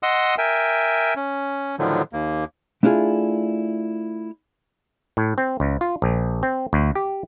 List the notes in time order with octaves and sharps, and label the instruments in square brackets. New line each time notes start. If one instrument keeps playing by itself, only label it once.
[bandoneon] D#5 F#5 C6 D#6 E6
A#4 E5 G5 G#5
C#4
A2 D3 D#3 F3 F#3
D#2 A#3
[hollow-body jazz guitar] A3 D4 E4 F4 G#4
[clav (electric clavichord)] A2
C4
C#2
F4
A#1
C4
D2
G4